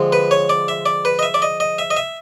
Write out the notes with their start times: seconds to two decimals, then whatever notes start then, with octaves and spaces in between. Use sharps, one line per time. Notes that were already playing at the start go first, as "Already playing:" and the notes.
Already playing: D3 F3 G#3 C4
0.12 B4
0.31 C#5
0.49 D5
0.68 E5
0.86 D5
1.05 B4
1.19 D#5
1.23 E5
1.34 D5
1.42 D#5
1.60 D#5
1.78 E5
1.91 D#5
1.97 E5